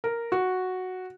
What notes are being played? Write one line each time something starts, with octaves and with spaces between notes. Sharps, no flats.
A#4
F#4